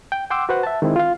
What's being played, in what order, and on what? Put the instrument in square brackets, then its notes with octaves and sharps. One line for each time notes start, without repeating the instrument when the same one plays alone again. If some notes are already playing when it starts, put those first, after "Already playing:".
[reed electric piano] G5
F#5 G5 C6 D6 E6
F#4 B4 C5 F#5
E5 A5
D#3 G#3 C4 E4
F4 F5